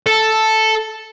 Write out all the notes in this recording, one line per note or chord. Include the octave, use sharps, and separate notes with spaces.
A4